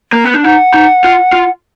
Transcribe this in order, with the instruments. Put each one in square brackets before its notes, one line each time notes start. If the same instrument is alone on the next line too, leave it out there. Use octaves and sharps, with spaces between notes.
[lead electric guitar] A#3
B3
D4
[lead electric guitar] D#4 [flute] F#5
[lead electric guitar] D#4
F4
F4